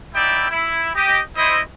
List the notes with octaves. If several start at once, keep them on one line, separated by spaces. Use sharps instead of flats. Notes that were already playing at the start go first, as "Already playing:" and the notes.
B3 D#4 E4 D5 E5 G5
E4
G4 D#5
E4 C5 D#5